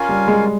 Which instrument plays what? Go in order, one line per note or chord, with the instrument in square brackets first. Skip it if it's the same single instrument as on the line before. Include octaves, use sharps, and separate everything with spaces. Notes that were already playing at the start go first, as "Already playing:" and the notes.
Already playing: [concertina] C#4 F4 A#4 F5 G#5
[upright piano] G3
G#3